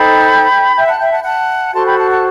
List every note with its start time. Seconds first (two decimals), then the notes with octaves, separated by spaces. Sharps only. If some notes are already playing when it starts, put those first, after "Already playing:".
Already playing: D#4 A4 C5 G5 B5
0.76 E5 G5
0.88 F#5 A5
0.99 E5 G5
1.12 F#5 A5
1.24 F#5 A5
1.73 F#4 A4 C5 A5 C6
1.86 G5 B5
1.98 F#5 A5
2.10 F#5 A5